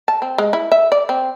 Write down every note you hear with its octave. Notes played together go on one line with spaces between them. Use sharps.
A5
C4
G#3
E4
E5
D5
C4